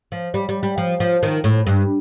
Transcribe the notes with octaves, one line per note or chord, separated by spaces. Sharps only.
F3
G3
G3
G3
F3
F3
D#3
A2
G2